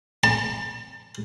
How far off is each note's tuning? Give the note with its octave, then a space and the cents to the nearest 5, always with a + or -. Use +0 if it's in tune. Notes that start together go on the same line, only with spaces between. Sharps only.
A5 +30